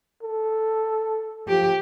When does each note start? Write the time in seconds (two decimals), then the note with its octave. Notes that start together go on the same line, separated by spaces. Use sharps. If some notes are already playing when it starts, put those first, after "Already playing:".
0.23 A4
1.48 F3 G4